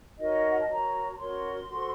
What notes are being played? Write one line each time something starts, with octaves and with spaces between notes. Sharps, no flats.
D#4 F#4 A#4 C#5 D#5
F#5
A5
F#4 A#4 C#5 A#5
A#5
C#4 F#4 A#4 C#5 C6
F#4 A4 C5